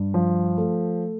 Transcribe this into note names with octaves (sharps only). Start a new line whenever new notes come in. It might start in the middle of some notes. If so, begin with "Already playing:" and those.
Already playing: G2
F3
A3